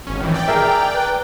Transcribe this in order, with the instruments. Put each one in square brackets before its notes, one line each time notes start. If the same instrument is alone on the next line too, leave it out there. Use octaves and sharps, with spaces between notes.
[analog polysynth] G#1 C#4
D#3 E3
D5 G5
[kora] G#4 A#4 E5 [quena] A#5
[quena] B4